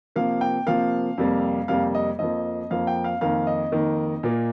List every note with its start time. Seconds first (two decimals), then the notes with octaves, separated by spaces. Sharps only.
0.16 C3 F3 A#3 F5
0.41 G5
0.67 C3 F3 A#3 F5
1.18 F2 C3 G3 A#3
1.68 F2 C3 G3 A#3 F5
1.95 D#5
2.19 F2 F3 A#3 D#5
2.70 F2 F3 A#3 F5
2.87 G5
3.04 F5
3.21 F2 D#3 A#3 F5
3.47 D#5
3.72 F2 D#3 A#3
4.23 A#2 A#3